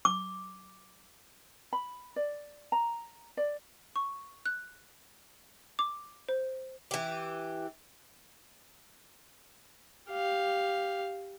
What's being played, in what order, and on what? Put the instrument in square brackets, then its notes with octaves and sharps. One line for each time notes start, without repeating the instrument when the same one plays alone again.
[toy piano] D6
[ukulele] B5
D5
A#5
D5
[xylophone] C#6
F#6
D6
C5
[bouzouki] E3 G4
[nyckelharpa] G4 F5